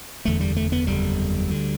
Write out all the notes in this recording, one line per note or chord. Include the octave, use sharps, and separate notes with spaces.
F#1 E2 D3 A3
G3
A3
B3
F#1 E2 D3 G3
D2 D3